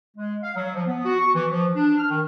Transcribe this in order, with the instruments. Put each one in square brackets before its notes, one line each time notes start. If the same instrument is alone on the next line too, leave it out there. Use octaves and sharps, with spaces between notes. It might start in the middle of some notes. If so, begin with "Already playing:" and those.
[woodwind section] G#3
F5
F#3
F3
B3
F#4
C#6
E3
F3
D4
F6
D#3